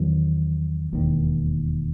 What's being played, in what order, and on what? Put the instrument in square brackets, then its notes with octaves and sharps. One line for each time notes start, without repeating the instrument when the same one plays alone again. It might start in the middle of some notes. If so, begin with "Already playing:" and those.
Already playing: [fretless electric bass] E2 D#3 F#3 B3
E1 D#2 D#3